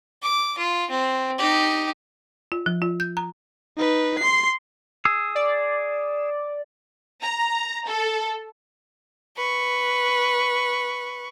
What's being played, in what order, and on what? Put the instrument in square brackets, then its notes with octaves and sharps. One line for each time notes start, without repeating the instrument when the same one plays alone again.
[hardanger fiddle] D6
F4
C4
D#4 G4
[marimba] F4
F3
F4
G6
A#5
[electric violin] D#4 B4
C6 C7
[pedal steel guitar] G#4 E6
[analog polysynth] D5
[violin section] A#5
A4
[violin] B4 C#6